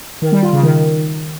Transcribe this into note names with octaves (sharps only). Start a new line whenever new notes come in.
D#3
G3
F4
C#3
D#3